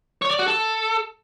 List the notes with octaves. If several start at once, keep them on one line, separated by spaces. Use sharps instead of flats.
C#5
D5
F#4
A4